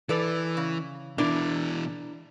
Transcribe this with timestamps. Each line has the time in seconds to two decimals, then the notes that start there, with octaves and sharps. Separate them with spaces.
0.09 E3 A4 B4 D5
0.57 C#3
1.18 B2 E3 D4 E4 A#4